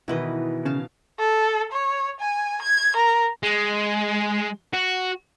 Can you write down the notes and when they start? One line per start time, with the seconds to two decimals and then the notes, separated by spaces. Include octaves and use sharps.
0.08 B2 D#3 E3 E4 B4 D#5
0.65 C#3 F5 A5
1.19 A4
1.72 C#5
2.20 G#5
2.62 G#6
2.97 A#4
3.43 G#3
4.73 F#4